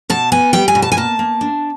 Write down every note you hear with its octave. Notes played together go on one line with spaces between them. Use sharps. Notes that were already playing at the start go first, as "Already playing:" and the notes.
B2 A5
B3 G#5
G3 G5
G#5
B2
A5
G#5
A#3 A5
A#3
D4